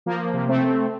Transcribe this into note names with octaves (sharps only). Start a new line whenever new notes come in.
F3 A#3
C3
A3 C4